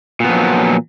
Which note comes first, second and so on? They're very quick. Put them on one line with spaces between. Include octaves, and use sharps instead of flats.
A#2 B3 F3 F#3